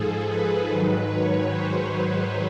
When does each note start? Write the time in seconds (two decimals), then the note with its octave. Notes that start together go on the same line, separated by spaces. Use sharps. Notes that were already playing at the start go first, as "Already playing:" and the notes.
Already playing: G#2 F3 G#4 A4
0.27 B4
0.67 G#2 D#3 F#3
1.07 C#5
1.48 C5
1.88 B4